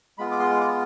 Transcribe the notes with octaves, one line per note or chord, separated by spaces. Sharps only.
G#3 B3 F4 B5
D6
C6
D6